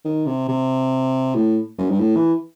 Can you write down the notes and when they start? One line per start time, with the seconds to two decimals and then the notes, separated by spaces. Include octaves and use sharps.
0.05 D#3
0.26 C3
0.48 C3
1.35 A2
1.78 F#2
1.90 G2
2.00 A2
2.16 E3